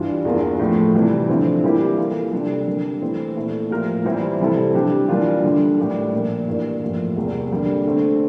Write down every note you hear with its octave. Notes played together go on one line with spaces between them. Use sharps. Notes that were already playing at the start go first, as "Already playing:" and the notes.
Already playing: G2 E3 G3 D4 F4
E2 E3 A#3 D4 F4
A2 F3 A3
C3 E3 G3
D3 F3 C4 E4
E3 G3 A#3 E4 G4
E3 A#3 F4 A4
C3 G3 D4 A4
D3 G3 A#3
E3 A3 C4
A#2 A3 E4
A2 F3 A#3 F4 A#4
E3 G3 C4 E4
C3 G3 C4 E4 A4
E3 G3 D4 G4
E3 G3 A#3 D4 F4
D3 G3 D4
A2 G3 D4 G4 A#4
A#2 F3 A#3
G2 E3 A#3
A2 F3 A#3
E2 C3 G3 A#3
D3 G3 A#3
D3 A3 C4